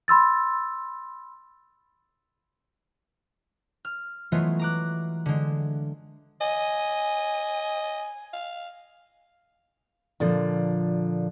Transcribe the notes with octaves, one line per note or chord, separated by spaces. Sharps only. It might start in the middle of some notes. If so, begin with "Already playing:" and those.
B5 C6 E6 A6
F6
E3 F#3 G#3 A3 B3 F4
A#5 D6 F#6
D3 G#3
D#5 G#5
F5
A#2 D3 F3